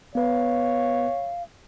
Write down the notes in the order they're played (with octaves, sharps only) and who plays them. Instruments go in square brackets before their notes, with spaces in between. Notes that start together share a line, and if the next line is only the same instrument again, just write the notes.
[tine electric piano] B3 B4 [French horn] C#5 [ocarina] F5